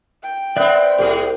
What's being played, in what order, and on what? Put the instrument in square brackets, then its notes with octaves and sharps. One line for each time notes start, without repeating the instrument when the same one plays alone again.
[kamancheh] G5
[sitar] B3 C4 [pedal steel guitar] D5 E5 F#6
[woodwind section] C2 [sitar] A2 G3 G#4